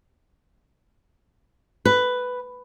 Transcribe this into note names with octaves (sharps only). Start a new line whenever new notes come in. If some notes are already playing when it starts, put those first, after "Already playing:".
B4